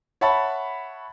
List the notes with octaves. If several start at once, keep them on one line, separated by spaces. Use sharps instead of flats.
C#5 E5 F#5 A5 B5 A6